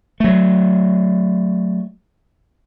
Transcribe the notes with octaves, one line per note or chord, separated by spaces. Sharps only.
F#3 A3